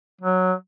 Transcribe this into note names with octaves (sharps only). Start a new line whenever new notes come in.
F#3